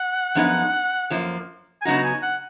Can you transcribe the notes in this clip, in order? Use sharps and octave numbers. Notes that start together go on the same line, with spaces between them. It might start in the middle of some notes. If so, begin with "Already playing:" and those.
Already playing: F#5
F#2 F3 B3 D#4 G#4
F#2 F3 A#3
G#5
C#3 F#3 B3 D#4 F#4 A#5
G#5
F#5